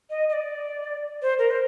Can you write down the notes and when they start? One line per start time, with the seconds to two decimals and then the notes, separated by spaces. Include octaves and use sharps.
0.10 D#5
0.29 D#5
0.33 D5
1.22 C5
1.39 A#4
1.51 C5